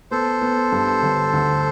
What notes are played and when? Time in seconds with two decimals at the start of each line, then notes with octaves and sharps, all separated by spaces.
0.11 B3 A4 C5
0.42 B3
0.72 G2
1.03 G1
1.33 D2